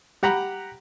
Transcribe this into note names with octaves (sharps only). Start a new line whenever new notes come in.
G4 F#5 A#5 B5